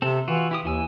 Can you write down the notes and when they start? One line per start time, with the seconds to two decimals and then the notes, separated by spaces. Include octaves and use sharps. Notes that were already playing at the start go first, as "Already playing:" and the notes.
0.02 C3 C4 A4
0.28 E3 F4 F#4
0.51 E4 G4 D#6
0.65 D#2 E3 G#5 E6